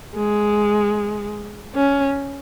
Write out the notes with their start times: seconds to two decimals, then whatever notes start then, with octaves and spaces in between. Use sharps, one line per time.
0.15 G#3
1.75 C#4